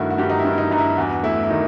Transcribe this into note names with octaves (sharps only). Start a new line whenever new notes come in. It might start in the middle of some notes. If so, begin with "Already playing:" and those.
Already playing: G2 D#3 A3 E4 F#4
F#4
G2 G4
D#4
E4
G2
E4
D#4
G2 D#4
E4
E2 F#4
A3 E4
E4
D#3 D#4